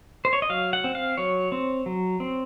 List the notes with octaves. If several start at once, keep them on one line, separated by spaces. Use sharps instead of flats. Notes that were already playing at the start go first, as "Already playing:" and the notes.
C5
C#5
D#5
F#3 F5
F#5
C4
F5
F#3 C#5
C4
F#3
C4